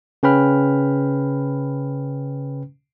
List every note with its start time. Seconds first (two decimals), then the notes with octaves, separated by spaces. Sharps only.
0.23 C#3 C#4 B4 G5 B5 F6